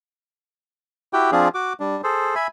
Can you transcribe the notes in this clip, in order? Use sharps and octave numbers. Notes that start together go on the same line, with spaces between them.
E4 F#4 G4 G5
F3 C4 D4 F4 G#4
F#4 D6
G3 D4
G#4 A4 C5
E5 G#5 B5